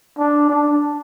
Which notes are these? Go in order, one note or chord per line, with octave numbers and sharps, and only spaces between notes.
D4
D4